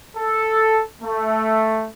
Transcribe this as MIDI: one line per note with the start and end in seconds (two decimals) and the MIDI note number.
0.17 0.83 69
1.02 1.88 57